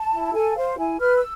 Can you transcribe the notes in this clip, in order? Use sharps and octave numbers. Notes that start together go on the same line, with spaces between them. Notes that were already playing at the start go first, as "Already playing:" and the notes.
Already playing: A5
E4
A4 G#5
C5 F5
E4 G#5
B4 F6
E6